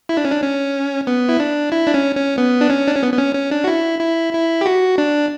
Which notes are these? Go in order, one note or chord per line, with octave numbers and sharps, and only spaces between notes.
E4
D4
C#4
D4
C#4
B3
E4
D4
E4
D4
C#4
C#4
B3
D4
C#4
D4
C#4
B3
B3
C#4
C#4
D4
F#4
E4
E4
E4
G4
F#4
D4